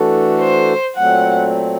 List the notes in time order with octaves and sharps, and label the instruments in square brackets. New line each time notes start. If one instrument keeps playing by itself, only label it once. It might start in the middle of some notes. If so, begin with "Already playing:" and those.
Already playing: [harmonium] E3 A3 D4 F#4 A4
[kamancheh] C5
[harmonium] A#2 F#3 A3 C4 [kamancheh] F#5